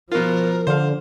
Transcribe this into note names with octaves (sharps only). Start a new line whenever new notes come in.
B2 F3 F4 A#4
D3 C5 F5